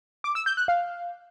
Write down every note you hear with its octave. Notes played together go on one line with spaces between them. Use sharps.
D6
E6
G6
F#6
F5